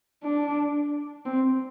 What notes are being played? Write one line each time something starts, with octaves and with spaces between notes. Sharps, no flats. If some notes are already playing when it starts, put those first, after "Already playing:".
D4
C4